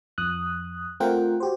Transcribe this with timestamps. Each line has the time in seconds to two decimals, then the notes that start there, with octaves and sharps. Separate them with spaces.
0.18 F2 D#6 F#6
1.00 A3 C4 F4 A#4 F#5 G5
1.40 F#4 G4 C5